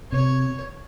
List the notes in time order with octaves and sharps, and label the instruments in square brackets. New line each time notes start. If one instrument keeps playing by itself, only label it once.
[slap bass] C3 [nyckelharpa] C#5